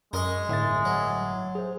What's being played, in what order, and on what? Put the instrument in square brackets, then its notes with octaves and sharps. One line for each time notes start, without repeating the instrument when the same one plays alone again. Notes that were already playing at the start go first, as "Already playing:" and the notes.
[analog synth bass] F#2 [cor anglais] G#3 [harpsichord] A#4 D#5 C#6
[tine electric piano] G1 E5 A6 [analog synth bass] A2
[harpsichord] F#3
[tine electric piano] G#4 C5